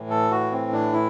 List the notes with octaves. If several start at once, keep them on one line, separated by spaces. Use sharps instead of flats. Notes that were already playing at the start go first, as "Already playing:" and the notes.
Already playing: A2 E3
A4
F#4
C4
D4
E4